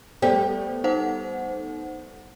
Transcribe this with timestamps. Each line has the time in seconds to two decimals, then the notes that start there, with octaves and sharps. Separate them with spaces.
0.22 G3 A3 B3 G4 C5 D5
0.84 D#4 C5 F#5